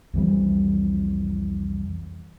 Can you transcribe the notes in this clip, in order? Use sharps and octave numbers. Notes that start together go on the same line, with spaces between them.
C2 F2 E3 G3